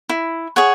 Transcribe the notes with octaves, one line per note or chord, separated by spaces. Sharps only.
E4
G#4 C#5 F#5